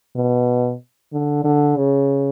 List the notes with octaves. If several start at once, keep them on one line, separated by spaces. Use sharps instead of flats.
B2
D3
D3
C#3